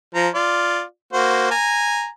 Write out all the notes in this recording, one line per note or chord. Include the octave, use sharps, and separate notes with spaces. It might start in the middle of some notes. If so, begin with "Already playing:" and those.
F3 A#5
F4 D5
A#3 F#4 C5
G#5 A#5